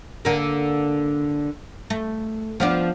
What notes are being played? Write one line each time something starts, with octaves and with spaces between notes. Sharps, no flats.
D3 A#3
A3
F3 B3 D4